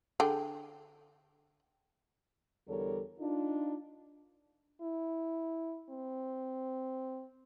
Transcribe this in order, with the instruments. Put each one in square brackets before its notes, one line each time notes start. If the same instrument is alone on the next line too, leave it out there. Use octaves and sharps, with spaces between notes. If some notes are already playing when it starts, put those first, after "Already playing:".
[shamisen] D3 G#4 G5
[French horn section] E2 D3 G3 A4 A#4 C#5
D4 D#4 F4
[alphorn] E4
C4